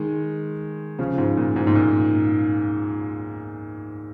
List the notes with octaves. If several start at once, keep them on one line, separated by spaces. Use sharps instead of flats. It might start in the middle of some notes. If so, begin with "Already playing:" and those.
Already playing: D#3 G#3
C#3 F3
G#2
A#2
G#2
G#2
A#2